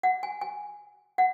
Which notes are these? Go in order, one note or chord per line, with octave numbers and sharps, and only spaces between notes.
F#5
G#5
G#5
F#5